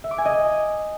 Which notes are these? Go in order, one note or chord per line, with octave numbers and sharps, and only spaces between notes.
E5
D6
G#5
D#5